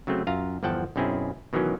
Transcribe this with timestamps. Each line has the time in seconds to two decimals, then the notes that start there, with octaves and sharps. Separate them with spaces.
0.07 C#3 F#3 A3 C4
0.27 F#2 F4 F5 A#5
0.63 G1 E2 F3 F#5 G5 A5
0.96 B1 F#2 C4 C#4 E4 G#4
1.53 B2 D#3 E3 F#3 C#4